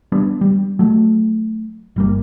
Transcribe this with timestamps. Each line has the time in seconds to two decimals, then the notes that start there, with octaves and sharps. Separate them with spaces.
0.12 G3 B3 D4
0.41 G3
0.79 F#3 A3
1.96 G1 G3 A#3